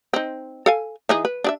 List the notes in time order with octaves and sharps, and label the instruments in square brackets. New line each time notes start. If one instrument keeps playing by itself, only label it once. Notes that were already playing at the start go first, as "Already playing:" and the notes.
[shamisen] C4 D#4
A4 F5 G#5
E3 D#4 G#4
B4
D4 G#4 E5